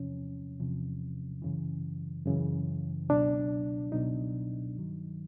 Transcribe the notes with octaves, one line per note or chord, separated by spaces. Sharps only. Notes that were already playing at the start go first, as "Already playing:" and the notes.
Already playing: E2 C3 F3 C#4
E2 C3 F3
F#2 C#3 E3
F#2 C#3 E3
C#2 B2 F#3 D4
C#2 B2 F#3 D#4
G2 D#3 F#3